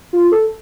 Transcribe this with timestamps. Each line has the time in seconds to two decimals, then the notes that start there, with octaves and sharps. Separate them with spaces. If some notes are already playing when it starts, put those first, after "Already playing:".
0.13 F4
0.32 A4